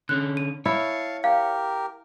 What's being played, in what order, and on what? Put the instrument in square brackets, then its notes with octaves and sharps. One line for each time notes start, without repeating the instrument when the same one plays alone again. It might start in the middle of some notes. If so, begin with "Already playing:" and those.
[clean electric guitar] D3 C#4 [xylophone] F#6
[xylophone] D#7
[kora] E4 [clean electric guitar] C#5 [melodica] F5 A5
[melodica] G4 A#4 [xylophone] F5